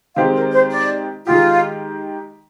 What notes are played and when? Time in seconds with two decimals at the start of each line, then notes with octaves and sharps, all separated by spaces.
0.15 D#3 G#3 C4 G4 F5
0.34 A#4
0.52 C5
0.72 D5
1.26 D#3 G#3 D#4 F4 G4